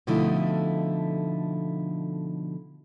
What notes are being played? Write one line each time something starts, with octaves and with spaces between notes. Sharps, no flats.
B2 D3 F3 A3 D#4 E4